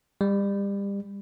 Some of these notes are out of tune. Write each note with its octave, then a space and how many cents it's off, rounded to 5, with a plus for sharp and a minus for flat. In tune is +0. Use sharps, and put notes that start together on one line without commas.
G3 +30